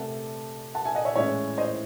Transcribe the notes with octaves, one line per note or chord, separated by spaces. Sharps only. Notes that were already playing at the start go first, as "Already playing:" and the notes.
Already playing: C3 A3 F#5 A5
F#5 A5
E5 G#5
D#5 F#5
C#5 E5
A2 E3 G#3 C#4 C#5 E5
C5 D#5